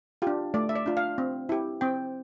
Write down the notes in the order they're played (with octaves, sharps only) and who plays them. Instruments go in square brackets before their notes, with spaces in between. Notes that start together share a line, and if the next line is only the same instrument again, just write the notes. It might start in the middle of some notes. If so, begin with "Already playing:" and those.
[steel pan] D4 F4 G4
A3 D5
E5
D5
D4 F4
F5
C4
E4 G4
C4 G5